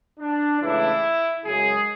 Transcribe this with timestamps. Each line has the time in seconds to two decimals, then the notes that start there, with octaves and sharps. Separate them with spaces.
0.20 D4
0.61 C#2 C#3 E3 A3 D4 E4
1.45 F#2 C#3 F#3 G#3 G#4